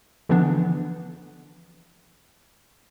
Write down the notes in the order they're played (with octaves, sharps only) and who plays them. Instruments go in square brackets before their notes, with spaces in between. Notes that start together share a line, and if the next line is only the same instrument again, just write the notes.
[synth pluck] D3 E3 F3 B3 D4